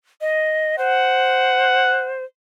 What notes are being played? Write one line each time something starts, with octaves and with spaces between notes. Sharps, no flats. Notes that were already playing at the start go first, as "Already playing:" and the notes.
D#5
C5 F#5